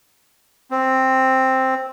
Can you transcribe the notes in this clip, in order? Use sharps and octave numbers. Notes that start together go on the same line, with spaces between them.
C4